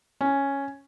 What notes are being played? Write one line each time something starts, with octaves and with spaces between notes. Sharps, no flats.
C#4